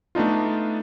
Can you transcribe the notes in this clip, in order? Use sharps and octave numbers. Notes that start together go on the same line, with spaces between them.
A3 B3 D4 D#4 F4